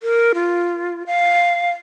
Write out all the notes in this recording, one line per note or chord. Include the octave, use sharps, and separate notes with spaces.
A#4
F4
F5